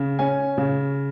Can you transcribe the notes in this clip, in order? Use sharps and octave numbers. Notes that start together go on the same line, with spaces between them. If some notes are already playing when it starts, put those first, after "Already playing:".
Already playing: C#3
C#4 G#5
C#3